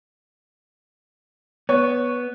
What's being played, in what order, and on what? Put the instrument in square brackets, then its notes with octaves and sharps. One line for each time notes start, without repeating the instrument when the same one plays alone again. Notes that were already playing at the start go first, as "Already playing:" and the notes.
[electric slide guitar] B3 [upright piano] C#5